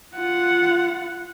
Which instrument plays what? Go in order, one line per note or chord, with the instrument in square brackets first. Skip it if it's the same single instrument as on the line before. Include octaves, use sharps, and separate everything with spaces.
[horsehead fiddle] F4 F#5